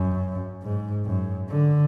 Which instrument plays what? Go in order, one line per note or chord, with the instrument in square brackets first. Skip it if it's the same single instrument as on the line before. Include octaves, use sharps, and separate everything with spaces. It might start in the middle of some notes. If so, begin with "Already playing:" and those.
Already playing: [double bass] F#2
G#2
F#2
D3